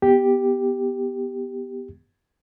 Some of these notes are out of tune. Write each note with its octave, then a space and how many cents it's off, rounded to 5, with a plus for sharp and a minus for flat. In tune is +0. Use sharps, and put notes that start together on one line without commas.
B3 +0 G4 +0